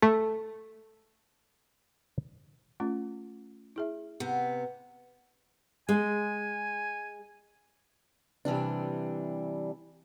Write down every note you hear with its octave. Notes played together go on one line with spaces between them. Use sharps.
A3 A4
A3 C#4 F4
E4 G#4 E5
C3 B3
G#3 G#5
C3 E3 G3 D4